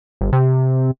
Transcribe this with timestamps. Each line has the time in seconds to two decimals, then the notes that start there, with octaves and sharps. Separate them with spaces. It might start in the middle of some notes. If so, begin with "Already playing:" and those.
0.21 G1
0.33 C3